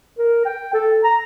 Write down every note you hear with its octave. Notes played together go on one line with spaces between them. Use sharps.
A#4
G5
A4
A#5